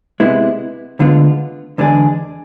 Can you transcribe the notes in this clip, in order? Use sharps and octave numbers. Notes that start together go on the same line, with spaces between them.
C3 G#3 B3 E4
D2 D3 G#3 B3 F4
E2 D3 G#3 D4 G#4